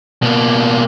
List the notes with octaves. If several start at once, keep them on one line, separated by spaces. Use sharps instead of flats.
B2 A#3